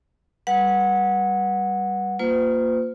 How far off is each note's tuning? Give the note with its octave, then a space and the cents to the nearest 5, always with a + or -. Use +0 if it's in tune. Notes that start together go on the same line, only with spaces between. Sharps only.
G3 +0 B4 -15 F#5 -15
A#3 -5 F4 +0 C5 -45